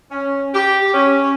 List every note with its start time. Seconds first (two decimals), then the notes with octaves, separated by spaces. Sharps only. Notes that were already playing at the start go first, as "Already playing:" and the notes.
0.12 C#4
0.54 G4
0.94 C#4